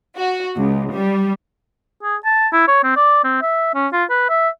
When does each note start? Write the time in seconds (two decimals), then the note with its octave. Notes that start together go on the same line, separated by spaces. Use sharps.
0.18 F#4
0.56 C#2
0.91 G3
2.03 G#4
2.25 A5
2.53 E4
2.68 C#5
2.83 C4
2.96 D5
3.24 C4
3.42 E5
3.74 C#4
3.92 F4
4.09 B4
4.29 E5